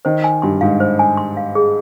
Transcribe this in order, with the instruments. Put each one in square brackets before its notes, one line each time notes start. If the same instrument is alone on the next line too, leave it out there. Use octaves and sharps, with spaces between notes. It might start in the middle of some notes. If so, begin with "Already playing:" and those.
[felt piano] D#3 [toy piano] C5
[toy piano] G#5
[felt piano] G2 [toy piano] C6
[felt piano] G#2 [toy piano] F5
[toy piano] C5
G#5
C6
F5
G#4